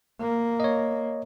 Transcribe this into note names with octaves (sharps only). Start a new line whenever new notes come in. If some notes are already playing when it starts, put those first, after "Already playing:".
A#3
C#5 D#5